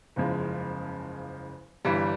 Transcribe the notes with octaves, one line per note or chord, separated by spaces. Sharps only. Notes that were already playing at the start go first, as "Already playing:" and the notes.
F#1 E2 C#3 F3 G#3
G1 G2 E3 G3